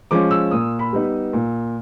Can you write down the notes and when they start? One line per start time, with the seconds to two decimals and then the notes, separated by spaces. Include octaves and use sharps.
0.11 F3 G#3 C#4 D6
0.31 E6
0.51 A#2 D#6
0.79 B5
0.93 G3 B3 D#4
1.33 A#2